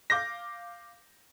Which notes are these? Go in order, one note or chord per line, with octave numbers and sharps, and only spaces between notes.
F5 D6 G6 A#6